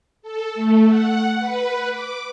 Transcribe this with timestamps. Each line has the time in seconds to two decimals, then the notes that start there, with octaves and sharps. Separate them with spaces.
0.22 A4
0.55 A3
0.88 F#5
1.39 B4
1.90 D6